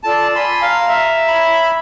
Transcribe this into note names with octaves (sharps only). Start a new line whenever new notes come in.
F4 A4 D5 A5
D5 G#5 B5 C6
F5 A#5
E5
C#5 B5